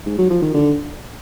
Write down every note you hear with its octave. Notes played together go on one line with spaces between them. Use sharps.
G#2
F#3
F3
D#3
D3